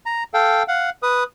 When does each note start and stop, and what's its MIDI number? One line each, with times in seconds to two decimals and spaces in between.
0.06 0.23 82
0.34 0.63 69
0.34 0.63 77
0.34 0.63 79
0.68 0.90 77
0.68 0.90 78
1.03 1.24 71
1.03 1.24 87